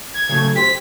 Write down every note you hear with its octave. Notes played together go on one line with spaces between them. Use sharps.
G#6
C#3 F#3 A3
G4 C5 B6